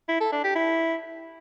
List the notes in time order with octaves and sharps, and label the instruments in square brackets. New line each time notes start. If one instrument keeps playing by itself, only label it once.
[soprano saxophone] E4
A4
D4
G4
E4